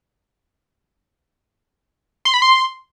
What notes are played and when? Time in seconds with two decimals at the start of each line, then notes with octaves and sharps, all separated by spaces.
2.25 C6
2.34 B5
2.42 C6